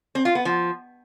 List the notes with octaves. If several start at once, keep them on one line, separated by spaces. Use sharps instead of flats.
C4
F4
B3
F3